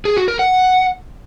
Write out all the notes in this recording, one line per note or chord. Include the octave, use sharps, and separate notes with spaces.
G#4
F#4
A#4
F#5